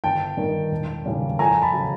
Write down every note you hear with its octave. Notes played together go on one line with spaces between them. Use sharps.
G1 G5 A5
G2 D#3
E1
D#2 C#3 E3 G3
F2 G#5 A#5
A5 B5
C#3 F#3